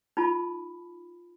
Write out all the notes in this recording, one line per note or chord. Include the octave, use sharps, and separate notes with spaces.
D#4 F4 A5 B5